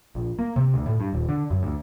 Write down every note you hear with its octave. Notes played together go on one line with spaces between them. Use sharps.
A#1
A#3
C3
D2
A2
G2
D#1
D3
F#2
D2